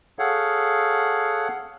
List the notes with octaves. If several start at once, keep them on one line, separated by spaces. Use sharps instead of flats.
G#4 A4 C#5 F5 F#5